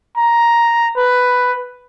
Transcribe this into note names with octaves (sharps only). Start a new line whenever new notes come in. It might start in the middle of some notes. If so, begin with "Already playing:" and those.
A#5
B4